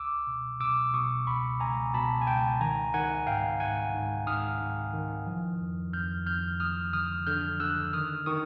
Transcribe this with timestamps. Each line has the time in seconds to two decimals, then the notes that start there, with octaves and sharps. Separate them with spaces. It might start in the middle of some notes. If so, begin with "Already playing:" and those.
Already playing: C#2 D6 E6
0.27 B2
0.60 B2 D6 E6
0.93 B2 C#6 D#6
1.27 C#2 B5 C#6
1.60 C#2 G#5 A#5
1.94 B2 A5 B5
2.22 G#5
2.27 C#2 G5 A5
2.61 D#3 G#5 A#5
2.94 D#3 F#5 G#5
3.27 G#2 F5 G5
3.60 G#2 F#5 G#5
3.94 G#2
4.27 G#2 D#6 F6
4.60 G#2
4.93 D#3
5.27 F3
5.60 F2
5.93 F2 F6 G6
6.27 F2 F6 G6
6.60 F2 D#6 F6
6.93 D3 D#6 F6
7.27 D3 F6 G6
7.60 D3 E6 F#6
7.93 D#3 D#6 F6
8.26 D#3 C#6 D#6